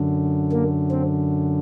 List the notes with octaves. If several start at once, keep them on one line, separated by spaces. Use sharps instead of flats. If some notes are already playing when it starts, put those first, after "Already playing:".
Already playing: F#2 D3
A#3
C4